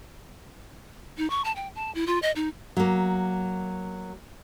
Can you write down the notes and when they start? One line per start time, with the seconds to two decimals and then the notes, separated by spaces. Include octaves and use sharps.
1.18 D#4
1.30 C#6
1.45 A5
1.56 G5
1.75 A5
1.95 E4
2.07 F4
2.22 D#5
2.36 D#4
2.77 F#3 A#3